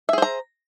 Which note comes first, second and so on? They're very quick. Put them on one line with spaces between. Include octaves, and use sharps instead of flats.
E5 G#4 C5 A#5